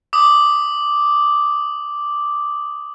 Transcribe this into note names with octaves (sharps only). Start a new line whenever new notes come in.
D6 D#6